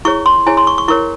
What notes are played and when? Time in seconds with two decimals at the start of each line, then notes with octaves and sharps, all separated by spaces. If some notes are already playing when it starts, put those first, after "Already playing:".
0.05 E4 G#4 C#5 C#6
0.26 C6
0.46 E4 G#4 C#5 G#5
0.57 C6
0.67 C#6
0.78 C#6
0.88 E4 A#4 C#5 C#6